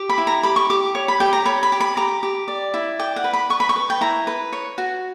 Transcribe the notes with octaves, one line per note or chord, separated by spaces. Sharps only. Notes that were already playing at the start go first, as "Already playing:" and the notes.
Already playing: G4
B5
E4
A#5
G4 B5
C#6
G4 D6
C#5
B5
G4 G5
A#5
C#5 B5
B5
G4
B5
G4 A#5
G4
D5
E4
D5 G5
F#5
B4
B5
B4 C#6
B5
C#6
B4
G5
E4 A#5
B4
C#5
F#4